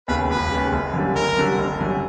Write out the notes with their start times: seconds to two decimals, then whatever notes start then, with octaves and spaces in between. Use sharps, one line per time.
0.08 D#2 C#3 B4
0.29 E1 B4
0.51 D#2 C#3
0.73 F#1
0.94 F#2 D3 G3
1.15 F#1 A#4
1.37 F#2 D3 G3
1.58 F#1
1.79 F#2 D3 G3